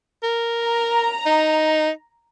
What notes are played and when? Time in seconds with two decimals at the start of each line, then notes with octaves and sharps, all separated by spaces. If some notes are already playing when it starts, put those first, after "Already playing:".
0.23 A#4
0.65 A#5
1.26 D#4